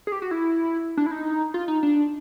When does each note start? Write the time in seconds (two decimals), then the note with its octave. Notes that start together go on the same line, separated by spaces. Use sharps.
0.07 G#4
0.12 G4
0.22 F#4
0.31 E4
0.97 D4
1.06 E4
1.11 D#4
1.54 F4
1.68 D#4
1.83 D4